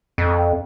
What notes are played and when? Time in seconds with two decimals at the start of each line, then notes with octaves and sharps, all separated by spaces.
0.18 F2